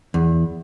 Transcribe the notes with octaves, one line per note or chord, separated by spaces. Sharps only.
E2